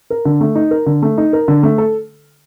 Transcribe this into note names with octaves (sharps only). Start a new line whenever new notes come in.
A#4
D3
A3
D#4
A#4
D3
A3
D#4
A#4
D3
A3
A4